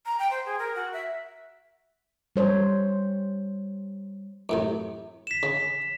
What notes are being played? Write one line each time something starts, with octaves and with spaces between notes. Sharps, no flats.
A#5
G5
C5
G#4
A#4
F#4
E5
G3 C5 C#5
F#2 A2 C3
B6 E7
C#3